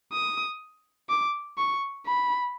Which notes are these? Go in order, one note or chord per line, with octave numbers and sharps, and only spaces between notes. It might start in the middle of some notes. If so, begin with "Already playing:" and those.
D#6
D6
C#6
B5